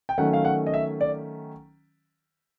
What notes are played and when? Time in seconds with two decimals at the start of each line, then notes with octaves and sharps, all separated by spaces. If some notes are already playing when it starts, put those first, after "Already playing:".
0.09 G5
0.18 D#3 F#3 A3 C#4 F#5
0.33 F5
0.45 F#5
0.67 D#5
0.74 E5
1.01 D5